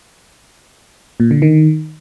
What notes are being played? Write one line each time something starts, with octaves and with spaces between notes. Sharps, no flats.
A#2
D3
D#3